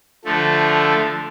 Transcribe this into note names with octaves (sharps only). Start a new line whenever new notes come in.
D3 F3 A3